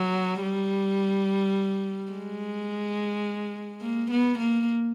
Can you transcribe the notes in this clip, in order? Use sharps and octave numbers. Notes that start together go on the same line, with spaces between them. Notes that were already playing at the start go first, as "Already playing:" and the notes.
Already playing: F#3
G3
G#3
A#3
B3
A#3